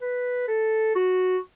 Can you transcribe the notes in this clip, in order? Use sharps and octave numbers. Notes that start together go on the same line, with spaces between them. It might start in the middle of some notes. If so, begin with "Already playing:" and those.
B4
A4
F#4